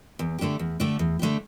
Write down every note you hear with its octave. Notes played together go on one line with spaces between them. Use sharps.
E2
D3 A3 D4 G4
E2
D3 A3 D4 G4
E2
D3 A3 D4 G4